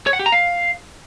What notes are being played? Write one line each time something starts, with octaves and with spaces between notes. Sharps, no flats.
C#5
F#5
G4
A#5
F5